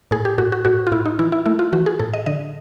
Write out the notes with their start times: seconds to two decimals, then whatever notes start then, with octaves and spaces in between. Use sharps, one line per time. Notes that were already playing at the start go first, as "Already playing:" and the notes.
0.11 A2 G#4
0.25 G4
0.38 A2 F#4
0.52 F#4
0.65 A2 F#4
0.87 F4
0.92 A2 E4
1.06 D#4
1.19 E3 E4
1.32 E4
1.46 A3 E4
1.59 F4
1.73 E3 F#4
1.86 G#4
1.99 A2 A4
2.13 D#5
2.26 D3 D#5